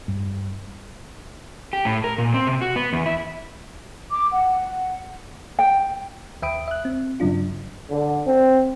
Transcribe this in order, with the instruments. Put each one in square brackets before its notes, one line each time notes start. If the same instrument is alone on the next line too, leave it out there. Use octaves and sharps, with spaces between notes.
[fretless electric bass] G2
[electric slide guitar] G4
A2
A#4
A#2
C4
C3
F#4
B3
E2
E4
[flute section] D6
F#5
[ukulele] G5
[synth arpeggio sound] D#2 E5 G5 B5 D#6 D7
E5 F#6
C4
G2 C#3 F#3 D4 F4
[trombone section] D3
C4